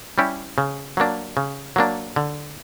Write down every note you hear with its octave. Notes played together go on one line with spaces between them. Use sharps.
G3 C#4 E4 G4
C#3
F#3 A#3 D4
C#3
F#3 A#3 D4
D3